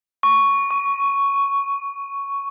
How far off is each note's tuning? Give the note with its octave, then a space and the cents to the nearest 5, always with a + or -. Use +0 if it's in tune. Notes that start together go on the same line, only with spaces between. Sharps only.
C#6 +5
C#6 +15